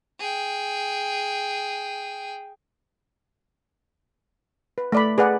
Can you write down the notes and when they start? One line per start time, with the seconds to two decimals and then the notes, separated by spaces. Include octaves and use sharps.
0.20 G#4 G5
4.78 B4
4.92 A3 D5 B5
5.18 G#4 B4 D5 F#5